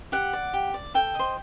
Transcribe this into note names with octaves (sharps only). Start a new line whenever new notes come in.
G4 F#5
D5
G4
D5
A4 G5
C5 D#5